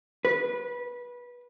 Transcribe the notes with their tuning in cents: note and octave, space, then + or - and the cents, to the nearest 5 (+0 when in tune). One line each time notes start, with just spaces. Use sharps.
B4 -20